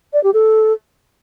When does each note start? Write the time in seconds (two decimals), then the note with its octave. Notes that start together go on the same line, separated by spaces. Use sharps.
0.13 D5
0.23 G4
0.34 A4